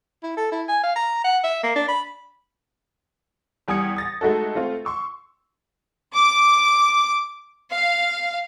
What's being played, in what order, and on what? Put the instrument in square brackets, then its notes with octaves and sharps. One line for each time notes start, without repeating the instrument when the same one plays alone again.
[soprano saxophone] E4
A4
E4
G#5
F5
A#5
F#5
E5
A#3
D4
B5
[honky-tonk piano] E2 G3 G#5 D#6 G#6 C#7
D#6 A6 A#6
G#3 A3 D#4 F#4 A4
A3 C4 F4
C6 C#6 E6
[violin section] D6
F5